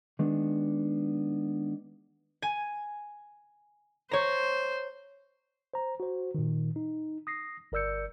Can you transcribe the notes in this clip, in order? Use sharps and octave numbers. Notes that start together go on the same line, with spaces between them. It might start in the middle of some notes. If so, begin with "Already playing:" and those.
D#3 G#3 B3 D4
G#5
C5 C#5 A#5
C5 A#5
F#4 C5
A#2 D#3
D#4
D#6 A#6 C7
G1 A#4 D5 E6 G6 C#7